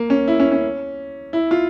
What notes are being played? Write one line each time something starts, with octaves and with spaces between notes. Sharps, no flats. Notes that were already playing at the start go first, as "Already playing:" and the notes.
Already playing: A#3
C#4
E4
C#4
C#4
E4
F4